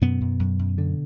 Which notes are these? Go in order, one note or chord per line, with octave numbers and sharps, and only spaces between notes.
F#2 B2 B3
F#2
F#2
F#2
D3